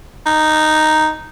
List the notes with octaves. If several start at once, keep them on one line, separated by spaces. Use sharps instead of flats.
D#4